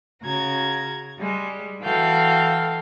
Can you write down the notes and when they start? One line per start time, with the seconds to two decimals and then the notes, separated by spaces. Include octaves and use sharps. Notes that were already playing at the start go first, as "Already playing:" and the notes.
0.22 C#3 F#4 A#5 G#6
1.18 G3 G#3
1.82 E3 F#4 A4 F5 G5 G6